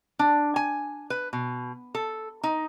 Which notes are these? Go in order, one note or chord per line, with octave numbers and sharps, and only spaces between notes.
D4
G#5
B4
B2
A4
D#4